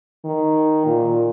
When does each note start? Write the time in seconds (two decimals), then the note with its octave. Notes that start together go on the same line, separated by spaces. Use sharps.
0.25 D#3
0.86 A#2